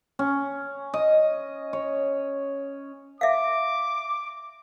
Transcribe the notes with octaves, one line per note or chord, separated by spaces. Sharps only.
C#4
D#5
C#5
E5 F5 D6